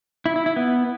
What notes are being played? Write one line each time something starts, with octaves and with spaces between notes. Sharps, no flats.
E4
E4
E4
B3